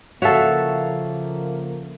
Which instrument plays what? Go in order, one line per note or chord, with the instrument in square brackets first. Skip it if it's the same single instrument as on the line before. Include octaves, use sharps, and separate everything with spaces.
[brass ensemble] C#3 F3 A#3 [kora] F#4 A4 [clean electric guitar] C#5 E5 F5